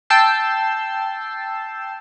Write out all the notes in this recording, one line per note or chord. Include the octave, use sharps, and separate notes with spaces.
G5 A5 E6 G6 C7